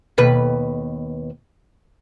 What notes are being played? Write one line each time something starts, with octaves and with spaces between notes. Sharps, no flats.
D#2 B2 B4